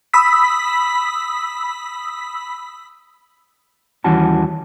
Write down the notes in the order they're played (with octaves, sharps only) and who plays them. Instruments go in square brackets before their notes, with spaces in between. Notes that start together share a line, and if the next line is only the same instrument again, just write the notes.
[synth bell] B5 D#6 E6 B6
[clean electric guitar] D#2 E3 G3 C#4 F#4 A5